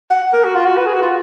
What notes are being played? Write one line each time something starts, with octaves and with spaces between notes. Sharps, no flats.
F#5
A#4
F#4
F4
F#4
B4
G#4
F#4
F4